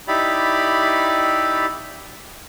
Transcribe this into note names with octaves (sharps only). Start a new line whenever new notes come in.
D#4 E4 G4 D5 B5